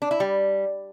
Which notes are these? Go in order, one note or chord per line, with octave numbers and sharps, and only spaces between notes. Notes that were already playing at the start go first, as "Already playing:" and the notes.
D4
E4
G3